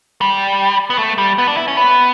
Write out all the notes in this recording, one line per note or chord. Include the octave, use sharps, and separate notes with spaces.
G3
B3
A3
G3
B3
D4
E4
C#4
B3